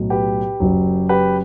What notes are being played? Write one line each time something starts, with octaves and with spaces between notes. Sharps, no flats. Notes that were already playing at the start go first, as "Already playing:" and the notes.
Already playing: B1 A2 F#3
G4 B4
F#1 F#2 F#3
G4 B4